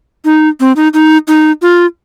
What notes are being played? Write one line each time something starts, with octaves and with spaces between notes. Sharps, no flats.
D#4
C4
D#4
D#4
D#4
F4